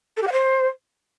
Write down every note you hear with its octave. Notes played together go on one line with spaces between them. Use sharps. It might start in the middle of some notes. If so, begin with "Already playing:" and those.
A4
G4
F#5
C5